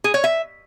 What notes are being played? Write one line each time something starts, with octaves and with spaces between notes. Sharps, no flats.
G#4
C#5
E5